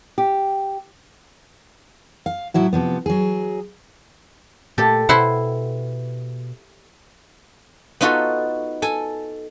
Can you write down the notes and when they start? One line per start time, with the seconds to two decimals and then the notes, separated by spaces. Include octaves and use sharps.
0.18 G4
2.26 F5
2.54 A2 F#3 E4 F#4
2.73 C3 F3 B3
3.06 F#3 G#4
4.78 A#2 A3 G4 A4
5.09 B2 E4 C5 F#5
8.01 B3 D#4 F4 F#4 A4
8.82 A4 G#5